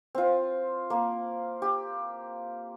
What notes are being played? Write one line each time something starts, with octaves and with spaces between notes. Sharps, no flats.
C4 F4
A#3
G4